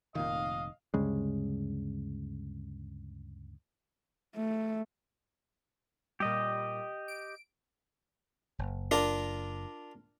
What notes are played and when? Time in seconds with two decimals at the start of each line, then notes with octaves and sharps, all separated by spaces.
0.15 F1 A#2 D#3 D#5 F5
0.94 D2 G2 C#3 G#3
4.36 A3
6.20 A#2 G3 G4 D#5
7.08 D7
8.59 F#1
8.91 D4 F4 A#4